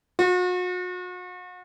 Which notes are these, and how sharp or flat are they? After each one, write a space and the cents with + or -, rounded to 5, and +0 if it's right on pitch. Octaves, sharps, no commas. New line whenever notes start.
F#4 -40